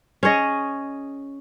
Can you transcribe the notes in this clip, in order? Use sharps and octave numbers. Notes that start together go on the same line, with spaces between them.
C#4 G#4 C#5 D#5